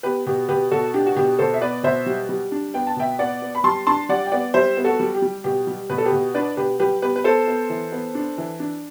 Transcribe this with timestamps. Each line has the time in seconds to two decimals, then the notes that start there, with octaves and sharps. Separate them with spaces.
0.03 B3 G4 B4
0.26 B2 G4
0.49 B2 G4 B4
0.71 B2 F#4 A4
0.94 D4 G4
1.06 F#4
1.16 B2 G4
1.39 B2 A4 C5
1.54 E5
1.61 B3 B4 D5
1.83 B2 C5 E5
2.06 G3
2.29 G3
2.52 D4
2.74 B3 G5
2.87 A5
2.96 B2 E5 G5
3.19 B3 D5 F#5
3.42 B3
3.55 B5
3.64 G3 A5 C6
3.87 D4 A5 C6
4.09 G3 D5 F#5
4.26 G5
4.32 B3 D5 F#5
4.54 G3 C5 E5
4.77 B3
4.84 F#4 A4
5.00 G3
5.15 G4
5.22 G3
5.44 B2 G4
5.67 G3
5.90 B2 B4
5.98 A4
6.06 G4 B4
6.12 B2
6.34 D4 B4 D5
6.57 B2 G4 B4
6.80 G3 G4 B4
7.02 B3 G4 B4
7.16 B4
7.24 B3 A4 C5
7.48 B3
7.70 E3
7.92 B3
8.15 D4
8.38 E3
8.60 D4